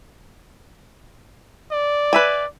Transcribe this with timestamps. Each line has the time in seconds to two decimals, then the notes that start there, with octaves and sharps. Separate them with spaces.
1.72 D5
2.13 B4 E5 G#5